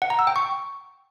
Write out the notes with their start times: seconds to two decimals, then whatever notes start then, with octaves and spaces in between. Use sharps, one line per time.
0.02 F#5
0.10 A#5
0.19 E6
0.27 G5
0.36 C#6